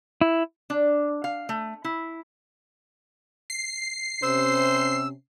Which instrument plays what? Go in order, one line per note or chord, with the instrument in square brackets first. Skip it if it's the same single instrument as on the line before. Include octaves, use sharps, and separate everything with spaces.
[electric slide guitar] E4
[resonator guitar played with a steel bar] D4
F5
A3
E4
[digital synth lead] C7
[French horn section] C3 C#4 [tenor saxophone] C5 [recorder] E6